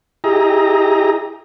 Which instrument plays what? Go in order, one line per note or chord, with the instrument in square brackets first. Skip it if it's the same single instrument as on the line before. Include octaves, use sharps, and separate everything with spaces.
[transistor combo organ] E4 G4 G#4 D#5 A#5